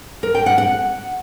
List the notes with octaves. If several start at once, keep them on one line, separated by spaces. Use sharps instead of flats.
A#4
G5
F#5
F#5